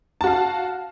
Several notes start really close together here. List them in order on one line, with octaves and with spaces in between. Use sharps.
A5 F#4 F5